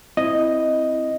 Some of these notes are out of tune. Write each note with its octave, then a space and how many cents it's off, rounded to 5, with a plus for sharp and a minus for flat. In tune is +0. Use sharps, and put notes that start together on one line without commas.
C4 +0 E4 +0 D#5 +0